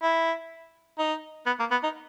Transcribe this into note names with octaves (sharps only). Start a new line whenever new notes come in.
E4
D#4
B3
A#3
B3
D#4